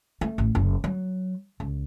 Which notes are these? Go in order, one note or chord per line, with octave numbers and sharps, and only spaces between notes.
A3
A1
F#1 F#3
F#3
C#2